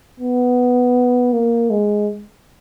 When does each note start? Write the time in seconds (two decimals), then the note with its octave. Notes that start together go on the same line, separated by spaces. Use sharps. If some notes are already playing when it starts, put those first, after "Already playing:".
0.20 B3
1.33 A#3
1.70 G#3